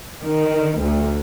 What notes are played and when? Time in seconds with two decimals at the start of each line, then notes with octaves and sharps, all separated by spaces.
0.23 D#3
0.79 D2